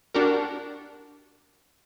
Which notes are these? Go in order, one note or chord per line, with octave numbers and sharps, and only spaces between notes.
D4 F#4 G4 A#4